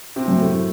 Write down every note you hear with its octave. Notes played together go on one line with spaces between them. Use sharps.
C3 C4
F#2
A2 A3